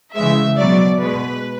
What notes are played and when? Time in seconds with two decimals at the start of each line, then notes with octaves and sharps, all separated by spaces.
0.15 C#3 E3 G#3 E5
0.57 B2 F#3 D5
1.00 B2 G#3 B4